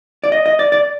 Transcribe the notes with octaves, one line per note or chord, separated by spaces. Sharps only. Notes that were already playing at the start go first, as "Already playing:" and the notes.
D5
D#5
D#5
D5
D5